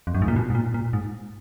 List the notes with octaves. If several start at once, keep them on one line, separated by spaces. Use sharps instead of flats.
F2
F#2
G#2
A#2
B2
G#2
A#2
A#2
G#2